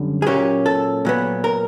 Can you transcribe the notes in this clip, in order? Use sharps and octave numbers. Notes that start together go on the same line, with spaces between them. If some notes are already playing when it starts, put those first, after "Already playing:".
Already playing: F#2 D3 G3
G#4
A#2 F#3 A#3 C#4 G4
A4
A#2 F#3 B3
A#4